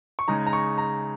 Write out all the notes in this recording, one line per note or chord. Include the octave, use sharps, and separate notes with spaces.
C#6
C#3 G#3 D#4 A#5
A#5
C#6
A#5